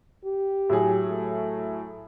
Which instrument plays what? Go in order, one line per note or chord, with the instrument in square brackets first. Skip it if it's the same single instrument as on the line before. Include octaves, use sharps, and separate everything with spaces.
[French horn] G4
[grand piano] A2 F#3 G#4
[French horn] A3